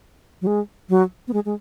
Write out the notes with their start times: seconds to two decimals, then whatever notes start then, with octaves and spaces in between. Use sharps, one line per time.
0.42 F#3
0.47 G#3
0.89 F#3
1.28 B3
1.33 G#3
1.45 G#3